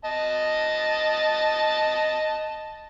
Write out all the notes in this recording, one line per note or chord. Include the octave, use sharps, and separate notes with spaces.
D#5 A5